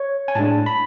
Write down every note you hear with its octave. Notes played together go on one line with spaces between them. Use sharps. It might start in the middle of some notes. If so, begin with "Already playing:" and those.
Already playing: C#5
G#5
A2 G#3 D4 A5
B5